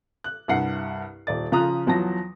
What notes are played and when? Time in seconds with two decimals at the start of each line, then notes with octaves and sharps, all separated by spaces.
0.24 F#6
0.48 C2 G2 F#5 C7
1.27 D#1 D5 A6
1.52 C#3 F3 F4 A#5 D#6 F#6
1.86 E2 F3 F#3 A5 A#6